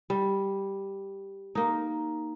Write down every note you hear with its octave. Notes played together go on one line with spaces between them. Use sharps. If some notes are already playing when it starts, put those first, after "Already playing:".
G3
A#3 D#4